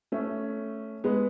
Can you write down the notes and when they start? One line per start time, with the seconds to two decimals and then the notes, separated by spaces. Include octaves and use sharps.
0.12 A3 C#4
1.04 G#3 B3